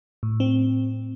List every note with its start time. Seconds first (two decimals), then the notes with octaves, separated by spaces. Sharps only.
0.23 A2
0.40 C4